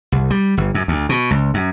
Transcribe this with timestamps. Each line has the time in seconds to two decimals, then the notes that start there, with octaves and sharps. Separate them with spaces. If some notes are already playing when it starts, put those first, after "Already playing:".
0.12 C2
0.30 G3
0.57 G1
0.74 F#2
0.88 D2
1.09 B2
1.31 C#2
1.54 F#2